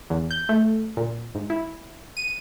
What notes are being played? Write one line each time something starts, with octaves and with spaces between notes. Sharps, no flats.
E2
G6
A3
A#2
G#2
E4
D#7